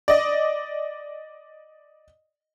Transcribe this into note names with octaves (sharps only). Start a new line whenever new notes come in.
D5 D#5